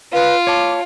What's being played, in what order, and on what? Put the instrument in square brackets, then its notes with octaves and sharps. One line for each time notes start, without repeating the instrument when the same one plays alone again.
[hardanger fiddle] F4 [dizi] B4 [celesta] F5
[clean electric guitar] C#5 A5 [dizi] D6